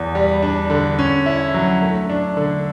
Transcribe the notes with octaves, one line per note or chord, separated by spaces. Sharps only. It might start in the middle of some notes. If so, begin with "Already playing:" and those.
Already playing: E2
G3
D4
D3
C#4
E4
F#3
A3
D4
D3